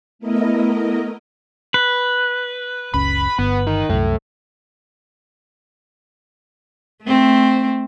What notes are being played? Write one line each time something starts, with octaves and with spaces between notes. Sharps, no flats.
A3 B3 E4 A#4 D#5
B4
F#1 C#2 C#4 B5
G1 B3
D#3
C2 F#2 A2
A3 C4